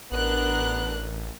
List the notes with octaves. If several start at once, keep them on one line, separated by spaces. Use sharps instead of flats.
A1 B3 D4 A#4 F#6